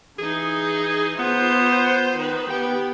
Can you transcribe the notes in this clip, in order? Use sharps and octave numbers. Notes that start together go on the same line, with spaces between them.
E3 D#4 G#4
B3 F4 C5
D#3 B4
B3 G4 G5